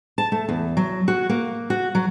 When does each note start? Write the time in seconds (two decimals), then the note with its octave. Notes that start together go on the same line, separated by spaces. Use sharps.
0.18 A5
0.32 A3
0.49 E2
0.77 F#3
1.08 F#4
1.29 A#3
1.70 F#4
1.95 F#3